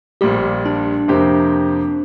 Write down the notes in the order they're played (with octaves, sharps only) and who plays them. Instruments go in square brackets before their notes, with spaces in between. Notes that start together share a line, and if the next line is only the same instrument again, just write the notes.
[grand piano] A#1 A#2 G3 [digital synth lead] G4
[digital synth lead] D4
[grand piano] F2 C3 A#3 G4 C5